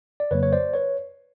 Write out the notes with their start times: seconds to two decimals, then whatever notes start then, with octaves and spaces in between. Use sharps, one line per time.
0.20 D5
0.31 F2 C#3 F#3 A#3 B4 C#5
0.43 C#5
0.53 C5 D5
0.74 B4 C#5